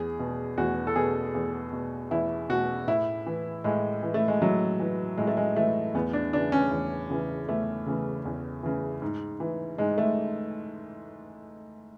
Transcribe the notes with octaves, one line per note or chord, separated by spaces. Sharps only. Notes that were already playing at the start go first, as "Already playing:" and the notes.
Already playing: E2 G#4
B2
E2 F#4
A4
B2 G#4
E2
B2
E2 E4
B2 F#4
A2 E4
E3
A2 G#3
E3
A3
G#3
A2 F#3
E3
A2 G#3
A3
G#3
E3 A3
E2 B3
D4
C#3 E3 D4
C#4
E2
C#3 E3
E2 A3
C#3 E3
E2
C#3 E3
G#2
E3
G#2 G#3
A3